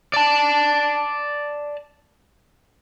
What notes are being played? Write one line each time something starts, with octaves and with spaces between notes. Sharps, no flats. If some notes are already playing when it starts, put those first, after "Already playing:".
D5 A5